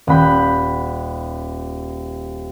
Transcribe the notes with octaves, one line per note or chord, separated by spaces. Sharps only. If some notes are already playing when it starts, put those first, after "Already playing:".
D#1 F#5 B5 G6